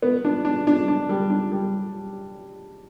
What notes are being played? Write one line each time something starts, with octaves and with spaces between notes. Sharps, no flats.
B3
D4
D4
D4
D4
G3
D4
G3